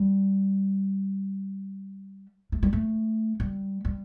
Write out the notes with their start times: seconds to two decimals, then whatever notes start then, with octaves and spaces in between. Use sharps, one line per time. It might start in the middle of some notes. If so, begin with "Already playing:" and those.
Already playing: G3
2.52 A3
2.63 G3
2.73 A3
3.40 G3
3.85 G3